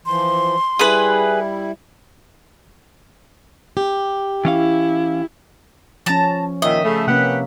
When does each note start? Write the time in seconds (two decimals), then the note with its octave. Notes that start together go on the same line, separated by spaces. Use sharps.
0.06 E3 F3 C6
0.79 G3 E4 G#4 B4
3.77 G4
4.45 E3 C#4 E4 F5
6.06 F3 C#4 A5 A#5
6.62 A#2 D#3 D#5 E5
6.83 C#3 A3
7.07 C3 A#3 C#4 G4 B4 F#5